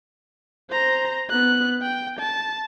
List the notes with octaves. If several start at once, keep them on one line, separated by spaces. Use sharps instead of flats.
C5 A#5
B3 F#6
G5
A5